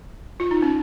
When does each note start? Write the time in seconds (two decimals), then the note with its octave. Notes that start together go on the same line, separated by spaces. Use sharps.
0.40 F4
0.51 D#4
0.62 C#4